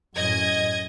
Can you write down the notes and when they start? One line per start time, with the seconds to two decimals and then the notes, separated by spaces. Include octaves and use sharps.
0.16 F#2 A2 D#5 G#6